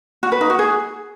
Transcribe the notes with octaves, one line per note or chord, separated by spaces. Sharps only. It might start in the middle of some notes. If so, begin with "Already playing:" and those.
F#4
B4
D#4
F#4
G#4